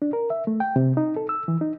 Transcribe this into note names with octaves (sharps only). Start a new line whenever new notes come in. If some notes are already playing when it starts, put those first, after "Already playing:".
D4
A#4
E5
A3
G5
C3
D#4
A4
E6
E3
D#4